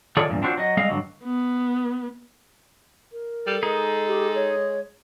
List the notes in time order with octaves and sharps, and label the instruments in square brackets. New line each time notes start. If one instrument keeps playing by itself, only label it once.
[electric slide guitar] D#3 F4 G#4 A4 C#5 D5
E2 G2 A#2
C4 D4 F4 F#4 B4 C5
F#3 D#5
G3 G#3 C4 G#4 D#5 F5
G2 D3 F#3
[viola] B3
[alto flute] A#4
[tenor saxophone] G3 [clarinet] A4
[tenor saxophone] G#3 [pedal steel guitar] D#4 G#4
[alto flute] G4
C#5